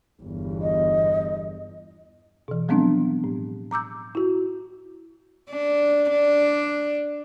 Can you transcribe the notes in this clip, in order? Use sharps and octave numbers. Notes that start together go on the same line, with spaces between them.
G1 E2
D#5
B2 E3
F3 F#3 G#3 B3 C4 D4
A2
A#5 D6 E6 G6
E4 F#4
D4
D4